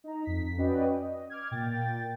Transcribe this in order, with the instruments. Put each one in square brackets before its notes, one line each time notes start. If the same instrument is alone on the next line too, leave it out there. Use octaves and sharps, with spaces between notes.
[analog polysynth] D#4 A#5
F2 B6
C#4 F#4 B4 D5 D#5 G5
D#5
D6 F6 G#6
A#2 G5 A6